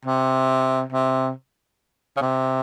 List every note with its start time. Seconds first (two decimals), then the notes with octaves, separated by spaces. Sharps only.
0.05 C3
0.92 C3
2.16 C#3
2.21 C3